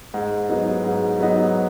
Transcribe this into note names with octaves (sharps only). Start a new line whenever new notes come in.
G#2
F#3 B3 D#4
G#2
F#3 B3 D#4